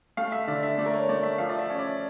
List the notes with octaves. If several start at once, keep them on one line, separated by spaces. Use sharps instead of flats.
A3 F5
E5
D3 D5
E5
A3 D5
A#4
C#5
A3 D5
E5
F3 F5
D5
E5
C#4
D5